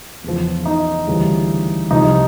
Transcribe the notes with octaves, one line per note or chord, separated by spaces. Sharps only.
E2 C#3 F3
D#4
D2 C#3 E3 G3
C2 C3 F3 D#4